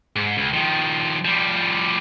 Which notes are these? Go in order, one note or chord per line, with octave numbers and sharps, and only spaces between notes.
G#2
C#2
D#3 F3
F3 G3